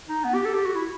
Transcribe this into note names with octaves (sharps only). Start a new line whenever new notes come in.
D#4
B3
G4
A4
G4
F#4
E4